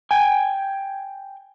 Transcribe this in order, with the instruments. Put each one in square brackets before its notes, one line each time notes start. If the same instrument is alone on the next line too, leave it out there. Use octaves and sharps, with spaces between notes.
[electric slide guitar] G5 G#5